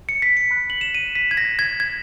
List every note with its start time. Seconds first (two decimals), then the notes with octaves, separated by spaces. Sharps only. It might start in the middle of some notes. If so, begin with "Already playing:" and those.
0.09 C#7
0.22 B6
0.37 C#7
0.51 B5 F#6
0.70 F#7
0.81 E7
0.95 D#7
1.15 B6
1.31 G#6
1.37 A#6
1.59 G#6
1.80 G#6